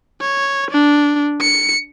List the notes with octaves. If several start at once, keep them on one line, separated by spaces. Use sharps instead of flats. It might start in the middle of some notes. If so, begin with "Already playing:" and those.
C#5
D4
C#7